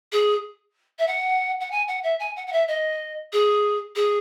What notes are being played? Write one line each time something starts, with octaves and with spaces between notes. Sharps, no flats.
G#4
E5
F#5
F#5
G#5
F#5
E5
G#5
F#5
F#5
E5
D#5
G#4
G#4